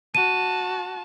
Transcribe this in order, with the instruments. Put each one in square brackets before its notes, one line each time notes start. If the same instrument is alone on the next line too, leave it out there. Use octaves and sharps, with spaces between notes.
[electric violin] F#4 A5 [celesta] D#7